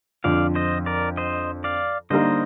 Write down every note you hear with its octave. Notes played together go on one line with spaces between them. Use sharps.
F2 D3 F3 D5 F5
C5 D#5
A#4 D5
C5 D#5
D5 F5
D3 G3 A#3 D#4 A#4 C5 D#5